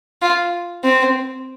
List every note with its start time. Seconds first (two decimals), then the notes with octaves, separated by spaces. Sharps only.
0.22 F4
0.85 C4